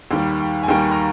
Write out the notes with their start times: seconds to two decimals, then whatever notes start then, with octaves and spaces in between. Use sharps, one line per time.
0.11 D#2 D#3 G3 G5
0.40 G5
0.63 G#5
0.68 D#2 D#3 G3 G5
0.91 A#5